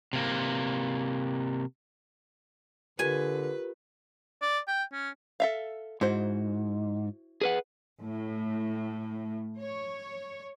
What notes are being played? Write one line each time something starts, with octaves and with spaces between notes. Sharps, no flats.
C3 A#3
D3 F4 G4 A#4 B4 G#5
D5
G5
C#4
A4 E5 F5
G#2 E4 F#4 C5
G#4 B4 F#5
A2
C#5